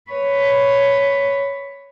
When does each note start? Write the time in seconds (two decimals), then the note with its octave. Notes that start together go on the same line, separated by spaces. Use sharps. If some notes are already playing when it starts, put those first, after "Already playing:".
0.11 B4 C#5